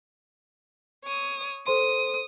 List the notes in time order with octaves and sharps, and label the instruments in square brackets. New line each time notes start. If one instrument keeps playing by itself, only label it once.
[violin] C#5 D#6
[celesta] A4 C5 C6 [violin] D#6